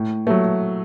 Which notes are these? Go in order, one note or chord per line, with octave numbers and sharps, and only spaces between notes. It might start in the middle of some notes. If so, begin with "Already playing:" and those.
Already playing: A2
F#3 A3